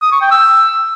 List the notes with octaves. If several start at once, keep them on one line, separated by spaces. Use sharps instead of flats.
D#6
C#6
G5
E6